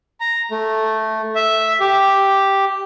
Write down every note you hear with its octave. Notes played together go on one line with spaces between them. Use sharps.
A#5
A3
E5
G4